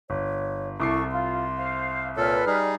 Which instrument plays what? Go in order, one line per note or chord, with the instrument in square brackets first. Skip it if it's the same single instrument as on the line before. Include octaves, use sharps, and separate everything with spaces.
[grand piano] G1 [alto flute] C#5
[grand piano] C2 D6 C7 [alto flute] E4 [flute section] A4 C#6
[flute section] F4 [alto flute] C6
[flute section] C5 F5
[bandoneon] A#2 A4 [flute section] B4 F6 [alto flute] C#5
[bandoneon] G3 D#4 G#4 [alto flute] D5